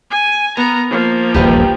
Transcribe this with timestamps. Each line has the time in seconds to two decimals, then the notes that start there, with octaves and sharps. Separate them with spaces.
0.11 G#5
0.57 B3 A#4 A#5
0.90 F3 A#3
1.35 D#1 A#1 E2 G4 B4 A#5